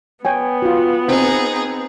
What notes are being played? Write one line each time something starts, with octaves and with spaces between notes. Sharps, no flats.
B3 C#5 G5 G#5
F4 F#4
C4 D#4 G#4